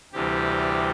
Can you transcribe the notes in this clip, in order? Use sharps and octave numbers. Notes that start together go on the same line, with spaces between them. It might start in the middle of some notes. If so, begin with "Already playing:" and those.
D2 C3 E3 G3 G4